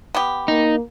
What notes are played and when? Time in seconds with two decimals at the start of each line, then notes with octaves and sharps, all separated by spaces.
0.15 B3 G4
0.48 A#3 D#4